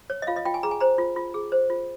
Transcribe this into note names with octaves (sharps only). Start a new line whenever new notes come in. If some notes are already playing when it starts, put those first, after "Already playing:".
C#5
D#5
F4 F5
D#5
F4 G5
G#5
G#4 A#5
G#5
C5 A#5
F4
F4
G#4
C5
F4